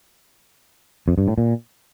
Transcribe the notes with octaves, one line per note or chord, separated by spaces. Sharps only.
F2
G2
A2
A#2